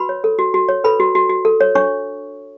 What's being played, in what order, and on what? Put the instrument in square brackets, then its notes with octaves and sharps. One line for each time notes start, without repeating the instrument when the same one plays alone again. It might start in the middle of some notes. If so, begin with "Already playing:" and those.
Already playing: [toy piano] F#4 B4 B5
C#5
A4
F#4
F#4
C#5
A4 B4 B5
F#4
F#4
F#4
A4
C#5
D4 C#5 C#6